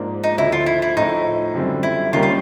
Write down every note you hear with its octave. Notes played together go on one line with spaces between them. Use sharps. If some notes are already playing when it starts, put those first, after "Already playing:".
Already playing: G#2 F3 A#3 D4
D#4
D2 D3 F3 E4
F4
E4
E4
A2 F3 A3 D#4
F#2 D3 G3 C4 F4
E4
D#2 D#3 G3 A#3 C#4 F4
F4